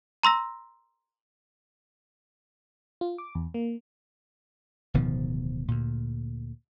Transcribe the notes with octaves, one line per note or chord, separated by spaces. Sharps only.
A#5 C6 E6 A#6
F4
D6
E2
A#3
D1 B2 D#3 F3
D2 A#2